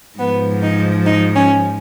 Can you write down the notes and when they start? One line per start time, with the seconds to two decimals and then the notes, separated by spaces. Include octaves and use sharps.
0.19 G#2 F3 B3
0.63 D#4
1.06 D#4
1.36 C#4